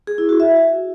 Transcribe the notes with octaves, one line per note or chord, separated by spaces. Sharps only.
G#4
E4
F#4
E5